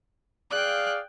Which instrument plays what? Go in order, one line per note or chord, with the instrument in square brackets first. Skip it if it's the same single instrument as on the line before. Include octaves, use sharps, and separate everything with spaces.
[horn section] G#4 D5 F5 [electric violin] G5 F#6